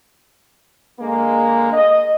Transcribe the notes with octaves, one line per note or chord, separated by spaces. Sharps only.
D3 G#3 A#3
D#5